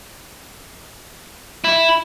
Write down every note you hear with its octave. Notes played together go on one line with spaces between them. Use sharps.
E4